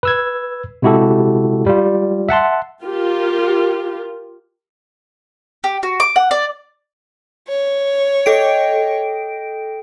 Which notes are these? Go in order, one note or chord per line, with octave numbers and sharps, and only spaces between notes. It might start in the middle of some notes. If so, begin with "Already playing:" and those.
B4 E6 G#6
C3 G#3 E4 F#4 G4 A4
G3 F4
E5 F#5 A5 C6
F4 G4 A#4
G4
F#4
D6
F#5
D5
C#5
A4 D#5 G5 D7